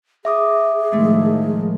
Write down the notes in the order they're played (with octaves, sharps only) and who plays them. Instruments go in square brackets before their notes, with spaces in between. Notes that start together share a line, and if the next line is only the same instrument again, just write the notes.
[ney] G#4 [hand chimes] E5 D6 D#6
[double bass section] A2 D#3 F3 [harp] G#3 A3